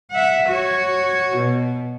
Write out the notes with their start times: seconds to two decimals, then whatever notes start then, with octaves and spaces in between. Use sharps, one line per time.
0.11 E5 F#5
0.48 F#4 C#5
1.35 B2